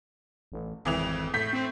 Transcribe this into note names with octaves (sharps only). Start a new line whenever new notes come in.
A1
G#1 F2 E3 F7
A2 G6 B6
C4